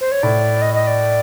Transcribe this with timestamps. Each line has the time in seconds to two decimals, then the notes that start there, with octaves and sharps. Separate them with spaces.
0.01 C5
0.12 C#5
0.23 A2 D5
0.62 D#5
0.74 D#5
0.87 D5